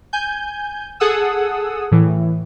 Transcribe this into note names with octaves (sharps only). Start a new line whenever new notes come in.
G#5 G6
G#4 A4 F#5 D#6 E6
A2 E3